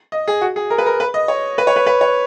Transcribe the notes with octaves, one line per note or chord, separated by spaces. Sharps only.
D#5
G#4
F#4
G#4
A#4
B4
A#4
B4
D#5
C#5
B4
C#5
B4
B4
C#5